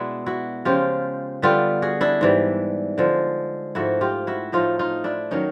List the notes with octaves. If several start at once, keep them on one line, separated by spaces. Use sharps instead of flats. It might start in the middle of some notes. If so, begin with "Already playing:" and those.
Already playing: B2 G#3 B3 D4 E4
E4 F#4
C#3 F3 G#3 F4 G4
D3 G3 B3 F4 G4
F#4 G#4
D4 E4
G#2 E3 G3
D3 F3 G#3
G#2 F3 A3 E4 F#4
F4 G4
E4 F#4
A2 F3 A3 D#4 F4
D#4 F4
D4 E4
D#3 F#3 C#4 D#4